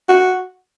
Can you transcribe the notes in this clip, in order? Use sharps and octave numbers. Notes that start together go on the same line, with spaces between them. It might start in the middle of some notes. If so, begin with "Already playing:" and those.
F#4